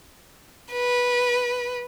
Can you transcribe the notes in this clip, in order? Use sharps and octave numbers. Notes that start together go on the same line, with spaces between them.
B4